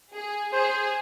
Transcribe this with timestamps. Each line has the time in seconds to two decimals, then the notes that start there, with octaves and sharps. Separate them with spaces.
0.13 G#4
0.52 G#4 C5